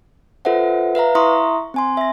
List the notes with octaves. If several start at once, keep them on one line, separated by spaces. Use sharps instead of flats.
F4 A4 B4 C5 E5 F#5
B4 E5 F5 A#5
E4 E5 A#5 C6 C#6 D#6
C4 G#5 C6
E5 A#6